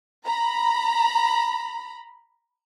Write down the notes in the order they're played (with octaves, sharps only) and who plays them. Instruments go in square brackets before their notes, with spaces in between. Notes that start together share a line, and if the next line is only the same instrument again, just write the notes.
[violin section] A#5 B5